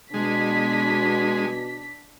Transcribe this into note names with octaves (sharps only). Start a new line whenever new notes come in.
B2 G#3 D4 B6